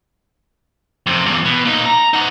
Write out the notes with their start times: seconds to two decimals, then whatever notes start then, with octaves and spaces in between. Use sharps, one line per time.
1.06 F2 C3
1.26 E2 G2
1.45 B2
1.65 A#2 D#4
1.86 A#5
2.13 D#4 F#5